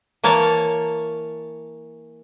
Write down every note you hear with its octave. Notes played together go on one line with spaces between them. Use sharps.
E3 A#3 C#5 A5